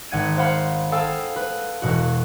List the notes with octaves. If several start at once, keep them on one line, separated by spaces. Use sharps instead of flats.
G#1 F#5 G#6 D#7
C5 F5 F#5 B5
G#4 A4 F5 G5 E6
B4
E1 B2 F#4